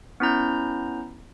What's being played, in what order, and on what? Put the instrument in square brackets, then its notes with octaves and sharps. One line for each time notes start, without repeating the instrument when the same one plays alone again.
[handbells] B3 C#4 E4 A#5 G6